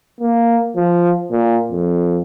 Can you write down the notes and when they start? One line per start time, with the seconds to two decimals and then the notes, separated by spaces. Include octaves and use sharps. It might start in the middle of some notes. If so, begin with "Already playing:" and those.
0.21 A#3
0.76 F3
1.31 A#2
1.71 F2